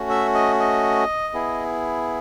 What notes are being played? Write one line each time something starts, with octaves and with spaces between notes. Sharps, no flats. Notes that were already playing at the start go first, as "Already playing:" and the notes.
Already playing: A3 C#4 F#4
E5
D#5
D#5
B3 E4 G#4